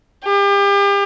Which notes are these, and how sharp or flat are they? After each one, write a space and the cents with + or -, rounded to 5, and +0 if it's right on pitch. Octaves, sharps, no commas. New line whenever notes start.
G4 +35